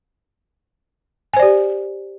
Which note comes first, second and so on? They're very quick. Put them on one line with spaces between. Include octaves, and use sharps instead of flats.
G#5 C5 D5 G4